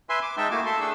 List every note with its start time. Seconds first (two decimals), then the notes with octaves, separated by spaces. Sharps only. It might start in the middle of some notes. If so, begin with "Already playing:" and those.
0.09 B4 E5 G#5 C6
0.22 D6
0.37 G#3 D#4 E5 G5 A5
0.51 A3 A#3 E4 F#4 G#5 D6
0.66 A4 E5 A5 C6
0.80 A3 D4 G#4 A4 E6